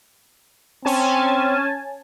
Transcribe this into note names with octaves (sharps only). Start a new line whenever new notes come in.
C4 C#4 G#5 A5